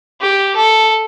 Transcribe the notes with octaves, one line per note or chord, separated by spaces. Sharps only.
G4
A4